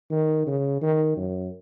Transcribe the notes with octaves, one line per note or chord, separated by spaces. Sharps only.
D#3
C#3
D#3
F#2